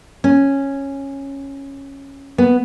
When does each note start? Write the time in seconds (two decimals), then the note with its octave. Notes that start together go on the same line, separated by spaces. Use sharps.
0.24 C#4
2.38 B3